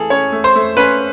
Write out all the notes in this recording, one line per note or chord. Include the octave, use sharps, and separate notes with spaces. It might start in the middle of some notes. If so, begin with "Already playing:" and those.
Already playing: E3 A3 G#4 A4
C#4 C#5
A3
C5
A3
C#4 B4